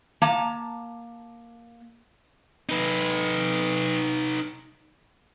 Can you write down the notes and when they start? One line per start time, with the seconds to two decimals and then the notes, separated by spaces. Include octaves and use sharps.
0.22 A#3 A5 A#5
2.69 D#4 B4